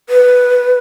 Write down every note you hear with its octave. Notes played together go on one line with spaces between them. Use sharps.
B4